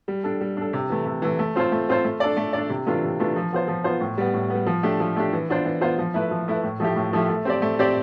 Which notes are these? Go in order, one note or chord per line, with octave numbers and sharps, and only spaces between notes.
G3
D4 A4
G3
D4 A4
C3
E3 A3
C3
E3 A3
A3
C4 F4 C5
A3
C4 F4 C5
A3
D4 A4 D5
A3
D4 A4 D5
C3
E3 A3 D4 F4
C3
E3 A3 D4 F4
F3
B3 F4 C5
F3
B3 F4 C5
A2
G3 B3
A2
G3 B3
F3
A3 D4 G4
F3
A3 D4 G4
E3
B3 D4 F4 C5
E3
B3 D4 F4 C5
F3
A3 E4 B4
F3
A3 E4 B4
A2
F3 A3 E4 G4
A2
F3 A3 E4 G4
A3
C4 G4 D5
A3
C4 G4 D5